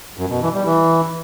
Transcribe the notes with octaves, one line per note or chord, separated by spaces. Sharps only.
F#2
B2
E3
G3
E3